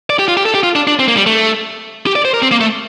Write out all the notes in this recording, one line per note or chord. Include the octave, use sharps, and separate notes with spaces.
D5
G4
F4
G4
A4
G4
F4
D4
D4
C4
A#3
G3
A3
G4
D5
C5
A#4
C4
A#3
A3